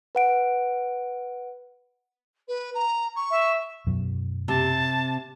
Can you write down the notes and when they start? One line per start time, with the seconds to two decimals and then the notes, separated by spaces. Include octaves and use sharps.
0.15 B4 F#5 D7
2.48 B4
2.74 A#5
3.15 C#6
3.31 E5
3.87 F#2 B2 F#3
4.48 C3 A5